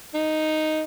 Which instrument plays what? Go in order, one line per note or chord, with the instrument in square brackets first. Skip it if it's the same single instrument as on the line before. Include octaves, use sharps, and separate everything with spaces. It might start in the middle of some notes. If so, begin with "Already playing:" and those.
[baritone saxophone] D#4